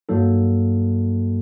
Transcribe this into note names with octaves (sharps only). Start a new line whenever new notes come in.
G2 F#3 A#3 D#4 A4